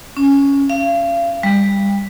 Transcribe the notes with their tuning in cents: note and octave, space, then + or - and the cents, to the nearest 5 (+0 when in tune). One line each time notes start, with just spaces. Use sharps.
C#4 +5
F5 -35
G3 +25